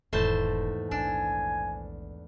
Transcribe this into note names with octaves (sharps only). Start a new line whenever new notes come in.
E1 E2 G#2 D#3 A3 C5 A5
A#1 D4 G#5 E6